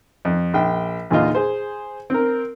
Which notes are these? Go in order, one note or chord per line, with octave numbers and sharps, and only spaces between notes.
F2
A#1 G5
E2 A#2 D3 D#4 F4
G#4 C5
C4 A#4